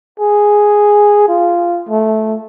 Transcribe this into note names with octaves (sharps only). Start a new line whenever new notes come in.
G#4
F4
A3